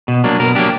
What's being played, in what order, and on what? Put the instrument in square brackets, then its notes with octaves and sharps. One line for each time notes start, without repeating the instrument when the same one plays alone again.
[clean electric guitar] B2
F#3 A#3 D4
B2 A#4
F#3 A#3 D4 G4